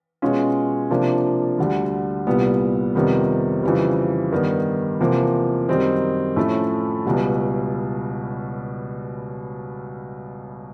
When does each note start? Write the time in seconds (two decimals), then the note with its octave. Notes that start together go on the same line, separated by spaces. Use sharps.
0.22 B2 G#3 C#4 F4
0.90 C3 F3 A#3 D4
1.59 D2 D3 G3
2.27 C2 A#2 G3 B3
2.95 F2 C3 D#3 G3 B3
3.63 F2 C#3 E3 G3
4.32 G2 D#3 G3 B3
5.00 E2 C3 F3 A#3
5.69 F#2 D#3 G3 C4 D#4
6.36 A2 F3 A3 C#4
7.06 C#2 B2 G3